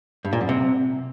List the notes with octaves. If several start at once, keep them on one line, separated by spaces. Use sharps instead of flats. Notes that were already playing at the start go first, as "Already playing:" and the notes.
G2
A#2
F#2
C3